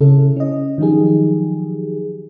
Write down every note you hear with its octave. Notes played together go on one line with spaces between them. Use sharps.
C#3 C#4 E4 A4
C#4 D#5
D#3 F3 F#3 D#4 G4 G#4